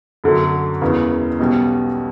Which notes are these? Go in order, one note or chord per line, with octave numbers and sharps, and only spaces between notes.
F#2 D3 F#3
E1 E2 C#3 E3
B1 B2 G3 C#4